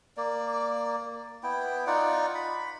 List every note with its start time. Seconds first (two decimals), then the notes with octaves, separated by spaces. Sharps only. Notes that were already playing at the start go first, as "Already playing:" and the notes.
0.17 A#3 D5
1.43 B3 E4 G5
1.87 D#4 F4 D5 F#5
2.35 B5